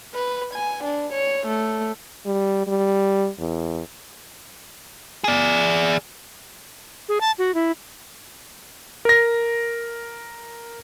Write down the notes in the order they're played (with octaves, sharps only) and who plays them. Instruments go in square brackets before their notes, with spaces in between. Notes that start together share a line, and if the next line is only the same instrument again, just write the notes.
[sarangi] B4
G#5
D4
C#5
A3
[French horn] G3
G3
E2
[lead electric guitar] G#4 D5
[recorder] G#4
A5
F#4
E4
[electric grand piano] A#4 A#6